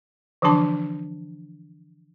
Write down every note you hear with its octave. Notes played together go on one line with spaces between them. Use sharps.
D3 E3 F3 D4 A5 D6